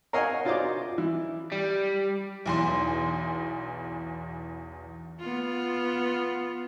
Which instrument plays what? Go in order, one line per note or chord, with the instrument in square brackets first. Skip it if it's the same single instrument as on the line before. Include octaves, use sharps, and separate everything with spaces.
[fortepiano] A#4 C#5 D#5 F5 F#5 G#5
D4 F4 F#4 C5 D#5 D6
E3
[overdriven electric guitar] G3
[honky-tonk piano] B1 E2 C6
[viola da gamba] B3 F4